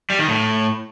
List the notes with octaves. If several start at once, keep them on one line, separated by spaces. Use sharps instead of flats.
G3
D#3
A2